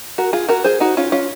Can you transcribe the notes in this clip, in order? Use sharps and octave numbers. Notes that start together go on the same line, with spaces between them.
F#4 A#4
F4 G#4
F#4 A#4
G#4 C5
D#4 F#4
C#4 F4
C#4 F4